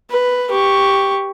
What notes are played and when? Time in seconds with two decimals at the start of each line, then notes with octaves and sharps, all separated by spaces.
0.11 B4
0.52 G4 C#6